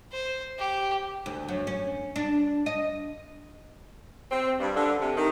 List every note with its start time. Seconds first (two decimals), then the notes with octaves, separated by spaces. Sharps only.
0.12 C5
0.59 G4
1.26 D2
1.49 F#2
1.67 C#4
2.16 D4
2.66 D#5
4.31 C4
4.60 G2
4.76 D3
5.01 C3
5.17 D#3